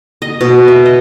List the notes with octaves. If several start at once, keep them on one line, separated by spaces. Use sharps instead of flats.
D#5
B2
E5
D#5